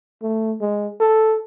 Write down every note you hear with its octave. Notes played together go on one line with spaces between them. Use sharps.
A3
G#3
A4